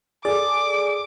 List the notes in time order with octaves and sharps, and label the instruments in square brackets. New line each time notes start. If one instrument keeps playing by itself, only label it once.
[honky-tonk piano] G#4 A4 [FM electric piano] D5 [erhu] D6